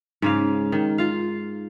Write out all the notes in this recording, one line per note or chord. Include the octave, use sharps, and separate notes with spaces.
G#2 C#3 F5
D#3
F4 F5